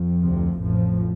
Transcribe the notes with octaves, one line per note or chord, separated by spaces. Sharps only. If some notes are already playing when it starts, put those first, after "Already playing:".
Already playing: F2 F3
D2 C3
A1 F2 A2 F3